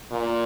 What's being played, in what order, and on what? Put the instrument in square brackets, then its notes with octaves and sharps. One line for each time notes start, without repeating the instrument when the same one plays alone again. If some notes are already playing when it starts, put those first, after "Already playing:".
[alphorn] A#2